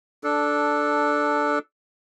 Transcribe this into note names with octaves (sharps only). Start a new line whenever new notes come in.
D4 A4